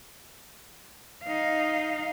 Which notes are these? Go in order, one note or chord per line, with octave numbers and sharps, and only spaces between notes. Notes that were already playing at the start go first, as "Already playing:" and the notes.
D#4 F5